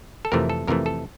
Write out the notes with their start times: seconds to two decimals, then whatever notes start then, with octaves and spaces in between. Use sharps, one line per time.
0.25 A4
0.32 F2 C3 E3 A3 A#4
0.50 A4
0.67 F2 C3 E3 A3 A#4
0.86 A4